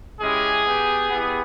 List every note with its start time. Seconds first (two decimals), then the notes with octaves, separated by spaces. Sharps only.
0.21 G#3 C#4 E4 G4 G#4
0.66 B3 G4
1.10 B3 E4 G4